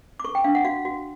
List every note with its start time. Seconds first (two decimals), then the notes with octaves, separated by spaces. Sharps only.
0.20 D6
0.24 A4 C#6
0.35 G5
0.44 D4 F5
0.55 F#5
0.65 F#4 F5
0.85 F#4